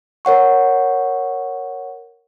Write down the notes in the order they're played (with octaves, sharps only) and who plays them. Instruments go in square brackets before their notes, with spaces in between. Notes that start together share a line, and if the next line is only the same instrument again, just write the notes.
[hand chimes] A#4 C#5 F#5 C#6